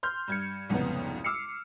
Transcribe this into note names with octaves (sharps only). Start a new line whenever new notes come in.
C6 F6 G6
G2 G#6 C#7
C2 F2 G#2 C#3 B3
D6 E6 F6 C7 C#7